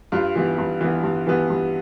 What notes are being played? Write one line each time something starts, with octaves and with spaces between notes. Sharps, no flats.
G2 F4
E3 G3 B3
G2
E3 G3 B3
G2
E3 G3 B3
G2